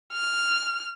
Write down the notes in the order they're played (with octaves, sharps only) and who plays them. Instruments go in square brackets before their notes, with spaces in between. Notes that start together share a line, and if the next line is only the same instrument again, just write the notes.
[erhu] F6